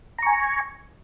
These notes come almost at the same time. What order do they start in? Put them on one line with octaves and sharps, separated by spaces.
A#5 C#6 G#5